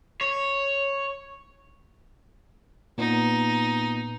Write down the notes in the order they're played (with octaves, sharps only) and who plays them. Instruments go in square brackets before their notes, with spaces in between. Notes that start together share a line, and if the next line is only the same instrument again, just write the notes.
[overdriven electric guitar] C#5
[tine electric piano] A#2 B3 [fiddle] D#4